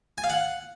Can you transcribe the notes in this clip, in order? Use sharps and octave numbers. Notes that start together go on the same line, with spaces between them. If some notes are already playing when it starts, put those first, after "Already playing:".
G#5
F5
F#5